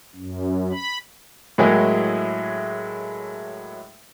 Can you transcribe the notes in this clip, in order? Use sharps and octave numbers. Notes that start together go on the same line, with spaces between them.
F#2
B5
A2 F#3 G#3 A#3 E4 G#4